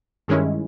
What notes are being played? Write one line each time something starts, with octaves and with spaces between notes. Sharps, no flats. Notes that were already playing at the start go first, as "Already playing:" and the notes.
G2 D#3 G#3 C#4 E4